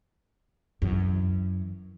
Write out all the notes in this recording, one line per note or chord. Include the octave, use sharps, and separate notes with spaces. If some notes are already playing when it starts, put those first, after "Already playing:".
F#2 E3